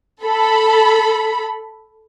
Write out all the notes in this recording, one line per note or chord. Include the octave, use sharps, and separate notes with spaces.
A4 B5